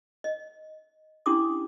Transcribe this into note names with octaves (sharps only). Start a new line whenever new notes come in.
D#5
C#4 D4 E4 G4 D6 D#6